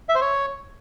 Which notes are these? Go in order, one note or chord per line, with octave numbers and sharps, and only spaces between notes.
E5
C5
C#5